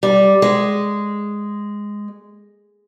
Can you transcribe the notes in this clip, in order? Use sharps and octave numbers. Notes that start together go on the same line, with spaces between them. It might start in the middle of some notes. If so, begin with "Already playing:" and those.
G3
G#3